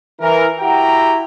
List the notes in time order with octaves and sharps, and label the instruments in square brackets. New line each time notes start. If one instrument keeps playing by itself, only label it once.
[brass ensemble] E3 A#4
E4 F#4 G4 F#5 G5 A#5